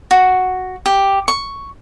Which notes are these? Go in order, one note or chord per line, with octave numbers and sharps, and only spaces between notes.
F#4
G4
C#6